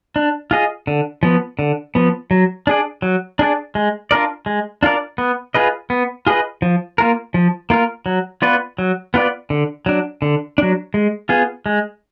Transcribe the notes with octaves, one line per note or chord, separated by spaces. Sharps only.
D4
F4 G#4 D#5
D3
F3 B3
D3
F3 B3
F#3
D4 G#4 D5
F#3
D4 G#4 D5
G#3
D4 F4 A#4 D5
G#3
D4 F4 A#4 D5
B3
F4 G#4 B4 D#5
B3
F4 G#4 B4 D#5
F3
A#3 F4 A#4
F3
A#3 F4 A#4
F#3
B3 F4 B4 D5
F#3
B3 F4 B4 D5
D3
F#3 D4
D3
F#3 D4
G#3
B3 F4 G#4
G#3